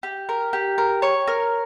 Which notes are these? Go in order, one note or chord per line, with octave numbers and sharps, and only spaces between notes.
G4
A#4
G4
A#4
C#5
A#4